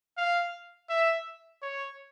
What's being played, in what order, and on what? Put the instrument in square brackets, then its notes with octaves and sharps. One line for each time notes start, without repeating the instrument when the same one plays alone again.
[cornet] F5
E5
C#5